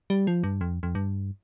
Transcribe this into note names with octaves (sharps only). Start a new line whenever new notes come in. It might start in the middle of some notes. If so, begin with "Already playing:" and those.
G3
F3
G2
F2
F2
G2